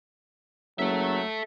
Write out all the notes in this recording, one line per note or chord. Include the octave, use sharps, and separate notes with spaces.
F#1 F#3 A4 E5